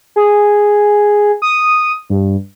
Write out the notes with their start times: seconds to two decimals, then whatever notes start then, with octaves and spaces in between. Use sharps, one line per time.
0.16 G#4
1.42 D#6
2.10 G2